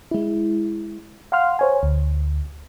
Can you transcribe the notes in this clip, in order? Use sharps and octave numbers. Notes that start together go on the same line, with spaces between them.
G#3 E4
F5 F#5 C6 F6
C5 C#5 G#5
D2